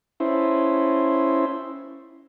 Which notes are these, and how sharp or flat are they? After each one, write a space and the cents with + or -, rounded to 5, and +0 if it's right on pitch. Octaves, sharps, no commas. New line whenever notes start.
C#4 +0 E4 +0 C5 +0